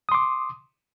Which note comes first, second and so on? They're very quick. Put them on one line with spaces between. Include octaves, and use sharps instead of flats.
D#6 C6 D6